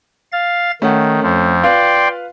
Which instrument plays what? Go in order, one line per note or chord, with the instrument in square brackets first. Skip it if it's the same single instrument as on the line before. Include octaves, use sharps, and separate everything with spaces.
[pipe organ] F5 A6
[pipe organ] D#3 [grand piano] A3 C#4 F#5
[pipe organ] F2 F3
[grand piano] F4 B4 F5 [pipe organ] D5 G5 C6